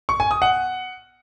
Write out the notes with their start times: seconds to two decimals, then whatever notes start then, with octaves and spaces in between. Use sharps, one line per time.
0.09 C#6
0.20 G#5
0.31 D#6
0.42 F#5